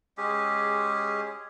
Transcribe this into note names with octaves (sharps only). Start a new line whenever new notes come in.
G#3 C#4 G4 G#4